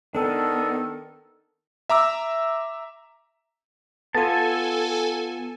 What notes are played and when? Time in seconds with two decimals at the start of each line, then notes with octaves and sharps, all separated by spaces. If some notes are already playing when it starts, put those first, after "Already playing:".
0.15 D#3 B3 D4 A4
1.90 E5 A#5 D6 E6
4.15 B3 F4 A4 G#5 A5